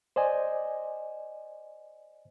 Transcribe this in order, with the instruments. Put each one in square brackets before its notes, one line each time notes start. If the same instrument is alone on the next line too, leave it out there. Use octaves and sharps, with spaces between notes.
[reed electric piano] C5 D5 D#5 G#5